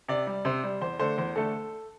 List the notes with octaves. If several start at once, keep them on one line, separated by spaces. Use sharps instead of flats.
C3 D5
G3
C3 C5
G3
E2 C5
D3 A3 C5
E2 C5
D3 A3 A4